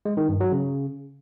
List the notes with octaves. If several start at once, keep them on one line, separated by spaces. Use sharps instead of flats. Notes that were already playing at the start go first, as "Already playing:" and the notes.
G#3
D#3
G2
F#3
C#3